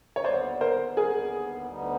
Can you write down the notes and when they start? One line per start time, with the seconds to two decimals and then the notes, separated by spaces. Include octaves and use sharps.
0.16 C#5
0.24 D#2 D3 G3 B3 C5 D5
0.61 A#4 C5
0.97 D#2 D3 G3 B3 G#4 A#4
1.70 D2 D3 G3 B3 D#4